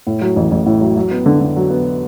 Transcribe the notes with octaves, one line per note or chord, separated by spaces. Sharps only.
A2
F#3
A1
A1
A2
F#3
F#3
B3
D3
D3
F#3
B3